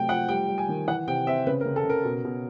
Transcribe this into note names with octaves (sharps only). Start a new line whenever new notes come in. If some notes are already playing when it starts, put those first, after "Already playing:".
Already playing: C3 F#3 A3 G5
F3 F#5
G3 G5
G3
G#5
D#3
E3 F#5
C3 G5
C4 E5
C#3 B4
A#4
C#3
A4
C#3 A#4
B2
B2